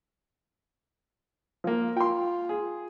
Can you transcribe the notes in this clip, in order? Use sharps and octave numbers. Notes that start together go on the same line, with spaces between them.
F3 A#3
F4 G5 C6
G#4